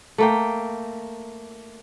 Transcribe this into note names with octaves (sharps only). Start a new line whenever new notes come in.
A3 A#3 G5